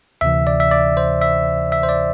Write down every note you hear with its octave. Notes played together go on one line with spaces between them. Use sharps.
D2 C3 E3 E5
D5
E5
D5
C5
E5
E5
C5
D5